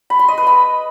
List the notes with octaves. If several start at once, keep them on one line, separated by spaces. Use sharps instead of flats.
B5
C6
D#5
B4
B5